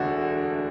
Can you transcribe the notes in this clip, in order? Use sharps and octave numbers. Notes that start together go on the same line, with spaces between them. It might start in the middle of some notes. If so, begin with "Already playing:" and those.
Already playing: E1 D2 D3 D4 F#4